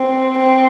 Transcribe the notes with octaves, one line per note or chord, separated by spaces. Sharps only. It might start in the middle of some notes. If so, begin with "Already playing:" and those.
Already playing: C4
C4